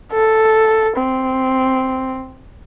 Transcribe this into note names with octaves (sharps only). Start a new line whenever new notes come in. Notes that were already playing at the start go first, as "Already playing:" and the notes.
A4
C4